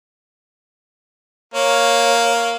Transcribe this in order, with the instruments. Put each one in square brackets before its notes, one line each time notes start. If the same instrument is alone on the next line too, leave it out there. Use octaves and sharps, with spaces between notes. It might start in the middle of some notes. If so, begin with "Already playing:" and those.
[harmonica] A#3 [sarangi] C#5